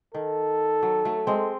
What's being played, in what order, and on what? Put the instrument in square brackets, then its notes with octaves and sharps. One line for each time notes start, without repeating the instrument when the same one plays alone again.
[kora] D#3 [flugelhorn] A4
[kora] F#3
F#3 A3
G#3 C4